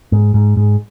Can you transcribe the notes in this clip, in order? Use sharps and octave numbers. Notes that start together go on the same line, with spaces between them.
G#2
G#2
G#2